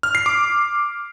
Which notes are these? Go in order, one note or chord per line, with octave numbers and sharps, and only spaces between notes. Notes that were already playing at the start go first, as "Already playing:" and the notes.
F6
C7
D6